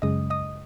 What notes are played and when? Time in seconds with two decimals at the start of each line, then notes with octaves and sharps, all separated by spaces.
0.02 F#2 C#3 G#3 D#5 D#6
0.30 D#5 D#6